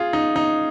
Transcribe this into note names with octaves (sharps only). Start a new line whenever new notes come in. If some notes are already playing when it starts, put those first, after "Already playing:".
Already playing: F4 G#4
D#4
D#4